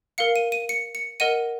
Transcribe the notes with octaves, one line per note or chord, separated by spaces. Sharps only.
A#4 F5 C#7
D#7
D#7
C#7
C#7
A#4 D#5 F#5 D#7